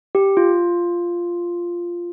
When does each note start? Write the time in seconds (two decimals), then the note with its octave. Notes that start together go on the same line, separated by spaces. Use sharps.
0.15 G4
0.37 F4